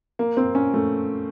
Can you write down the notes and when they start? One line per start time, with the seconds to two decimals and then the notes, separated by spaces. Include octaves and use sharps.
0.19 A#3
0.37 C4
0.55 C#4
0.74 A3